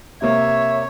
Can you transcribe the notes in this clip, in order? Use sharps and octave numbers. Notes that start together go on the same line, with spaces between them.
C3 A#3 C#5 E5